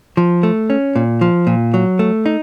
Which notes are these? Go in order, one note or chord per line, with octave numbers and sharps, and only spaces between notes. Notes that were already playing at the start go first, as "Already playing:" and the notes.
F3
A3
C#4
A#2
F3
A#2
F#3
A3
D#4